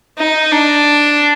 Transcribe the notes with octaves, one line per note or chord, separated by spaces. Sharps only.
D#4
D4